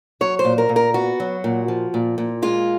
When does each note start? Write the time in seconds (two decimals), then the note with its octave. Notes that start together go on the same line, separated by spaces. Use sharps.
0.21 F#3 C#5
0.39 C5
0.45 A#2
0.58 A#4
0.69 A#2
0.76 A#4
0.94 B3 F#4
1.20 F#3
1.44 A#2
1.68 F3
1.94 A#2
2.18 A#2
2.42 G#3 F4